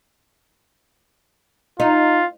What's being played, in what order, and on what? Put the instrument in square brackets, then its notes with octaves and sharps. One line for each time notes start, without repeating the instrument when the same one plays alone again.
[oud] D#4 [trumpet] F4